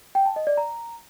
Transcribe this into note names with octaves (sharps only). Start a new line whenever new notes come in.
G5
A5
D#5
D5
A#5